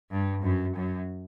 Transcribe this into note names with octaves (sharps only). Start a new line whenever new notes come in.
G2
F#2
F#2